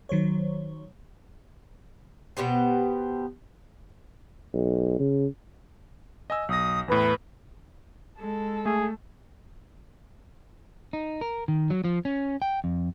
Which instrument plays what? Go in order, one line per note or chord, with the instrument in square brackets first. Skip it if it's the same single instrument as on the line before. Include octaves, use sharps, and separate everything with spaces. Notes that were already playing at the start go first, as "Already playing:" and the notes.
[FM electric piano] D#3 F#3 C5 C#5
[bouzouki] B2 B3 G4 C5
[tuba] B1
C#3
[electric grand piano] D#5 G#5 E6
[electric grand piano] B1 A#6 [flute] D#6
[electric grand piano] E2 A2 [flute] B4
[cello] G#3 [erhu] A4
[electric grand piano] A3 [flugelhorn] G#4
[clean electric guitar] D#4
A#4
D#3
F#3
F3
C#4
G5
F2